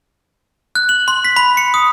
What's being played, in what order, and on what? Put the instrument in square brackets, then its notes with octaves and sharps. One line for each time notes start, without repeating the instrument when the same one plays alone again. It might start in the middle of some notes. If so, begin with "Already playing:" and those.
[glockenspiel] F#6
F#7
C6
B6
B5
C#7
D#6